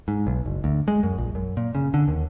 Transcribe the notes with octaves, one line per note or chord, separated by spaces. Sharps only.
G#2
B1
F#1
D2
G#3
F#2
A#1
F#2
A#2
C#3
D3
D#2